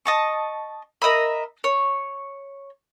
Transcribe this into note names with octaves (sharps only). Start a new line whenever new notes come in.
D#5 A5 C#6
A#4 D#5 E5 B5
C#5